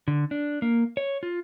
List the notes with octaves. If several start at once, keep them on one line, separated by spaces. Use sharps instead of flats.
D3
D4
A#3
C#5
F4